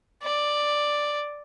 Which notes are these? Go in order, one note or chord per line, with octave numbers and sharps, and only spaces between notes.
D5